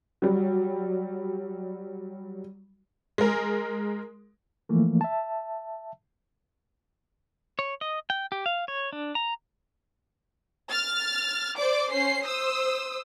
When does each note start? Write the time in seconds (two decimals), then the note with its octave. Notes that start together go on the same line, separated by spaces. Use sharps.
0.22 F#3 G3
3.18 G#3 A#4
4.69 E3 F3 A3 A#3
5.01 E5 A5
7.59 C#5
7.81 D#5
8.10 G5
8.32 G4
8.46 F5
8.68 C#5
8.93 D4
9.15 A#5
10.71 F6 A6
11.57 C5 D5 D6
11.92 C#4 C5 C7
12.24 C5 D#6 E6